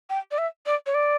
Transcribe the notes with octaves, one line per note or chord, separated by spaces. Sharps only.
G5
D5
E5
D5
C#5
D5